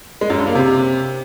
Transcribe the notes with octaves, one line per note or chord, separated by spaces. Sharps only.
G#3
F#2
G2
A#3
C3